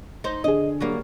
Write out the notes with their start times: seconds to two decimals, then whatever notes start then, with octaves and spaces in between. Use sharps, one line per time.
0.24 D#4 C5
0.44 D3 G#4 D#5
0.81 F#3 G3 A#3